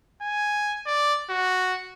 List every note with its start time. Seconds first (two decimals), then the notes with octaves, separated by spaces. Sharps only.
0.22 G#5
0.87 D5
1.30 F#4